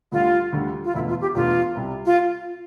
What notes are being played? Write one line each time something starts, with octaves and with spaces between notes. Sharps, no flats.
D2 D3 G3 F4
D2 D3 G3
F4
E1 D2 D3 E4
F4
G4
E1 D2 D3 F4
C2 C3 G3
F4